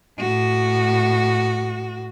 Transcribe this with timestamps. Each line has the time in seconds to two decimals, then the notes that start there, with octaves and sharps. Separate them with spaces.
0.19 A2 F#4